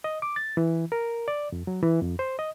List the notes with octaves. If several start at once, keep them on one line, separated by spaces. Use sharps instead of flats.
D#5
D6
A6
E3
A#4
D5
F2
F#3
E3
F2
C5
D#5